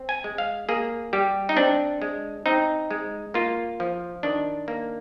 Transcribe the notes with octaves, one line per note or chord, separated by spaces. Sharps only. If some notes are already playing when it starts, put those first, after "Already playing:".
Already playing: C4
G#5
G#3
F5
A#3 G#4
G3 G4
D#4
C4 D4
G#3
C4 D#4
G#3
A#3 F4
F3
D#3 D4
A#3